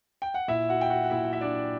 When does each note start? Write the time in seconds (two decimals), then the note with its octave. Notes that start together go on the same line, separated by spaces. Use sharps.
0.22 G5
0.34 F#5
0.48 A#2 E4 E5
0.69 F#4 F#5
0.81 G5
0.90 F#4 F#5
1.03 F#5
1.10 A#2 E4 E5
1.23 F#5
1.33 E5
1.41 D4 D5